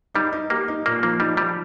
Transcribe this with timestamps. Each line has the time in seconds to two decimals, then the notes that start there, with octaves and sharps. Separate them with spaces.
0.14 G3 D#4
0.32 D#4
0.50 A#3 G4
0.68 D#4
0.85 A#2 A#3
1.03 F3 A#3
1.20 G3 D#4
1.37 F3 G3